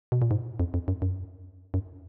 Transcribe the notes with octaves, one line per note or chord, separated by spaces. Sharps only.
B2
A#2
G#2
F2
F2
F#2
F#2
F#2